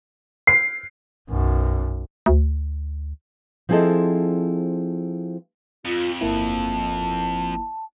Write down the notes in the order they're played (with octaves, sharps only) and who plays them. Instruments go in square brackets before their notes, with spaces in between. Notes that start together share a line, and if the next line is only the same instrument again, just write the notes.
[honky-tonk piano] C7
[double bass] B1 F#2
[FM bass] D2
[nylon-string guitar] F3 C4 E4 G#4 A4 D#5
[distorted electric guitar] F2 [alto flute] F4
[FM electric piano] G1 A#3 E4 [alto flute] A5